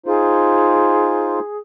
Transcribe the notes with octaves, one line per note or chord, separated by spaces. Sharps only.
D#4 F4 G#4 C5